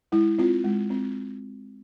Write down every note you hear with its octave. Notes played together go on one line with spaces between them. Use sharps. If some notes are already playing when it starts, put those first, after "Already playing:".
G#3 E4
C4 F4
G#3
C4